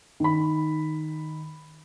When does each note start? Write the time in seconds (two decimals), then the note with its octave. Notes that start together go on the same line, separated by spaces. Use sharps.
0.20 D#3 B5